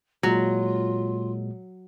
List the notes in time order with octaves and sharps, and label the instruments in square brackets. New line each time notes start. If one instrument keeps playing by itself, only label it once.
[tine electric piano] A#2 G#3 [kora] F#3 [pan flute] F4